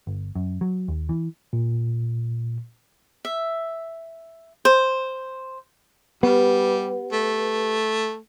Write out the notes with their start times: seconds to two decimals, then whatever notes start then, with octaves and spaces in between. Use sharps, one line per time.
0.07 G1
0.35 F#2
0.61 F#3
0.88 D#2
1.09 E3
1.53 A#2
3.25 E5
4.65 C5
6.23 G3 B3 G4 B4
7.12 A3